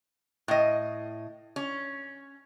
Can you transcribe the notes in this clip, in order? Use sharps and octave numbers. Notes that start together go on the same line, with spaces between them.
A2 D#5
C#4